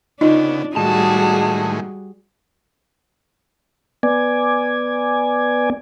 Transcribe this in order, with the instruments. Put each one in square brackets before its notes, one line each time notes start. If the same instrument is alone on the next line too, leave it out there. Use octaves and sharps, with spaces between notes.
[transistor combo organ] C#3 B3 [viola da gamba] D4 [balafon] D#4 F4 D#5
[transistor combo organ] A2 D#3 G#3 [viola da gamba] G3 F#4 G#4 [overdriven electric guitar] A5
[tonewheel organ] B3 D5 G#5